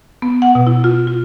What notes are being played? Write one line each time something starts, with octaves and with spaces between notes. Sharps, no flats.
B3
F#5
B2
E4
F4
F4